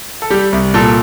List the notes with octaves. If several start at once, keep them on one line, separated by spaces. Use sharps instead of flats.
A4
G3 G4
C2
A#2 A4